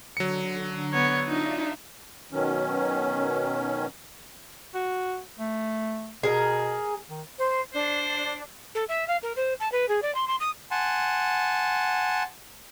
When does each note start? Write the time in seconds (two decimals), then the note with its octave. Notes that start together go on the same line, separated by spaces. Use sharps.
0.17 D3 F#3 C#7
0.93 B3 C#5
1.28 D4 D#4 F4 E5
2.32 B2 D#3 F#3 C#4
4.75 F#4
5.39 A3
6.23 B2 G#4 A#4
7.09 D#3
7.38 C5
7.74 D4 C5
8.74 A4
8.88 E5
9.07 F5
9.22 A#4
9.36 C5
9.60 A5
9.71 B4
9.88 G#4
10.02 D5
10.14 C6
10.27 C6
10.40 D#6
10.71 F#5 G#5 A5 C6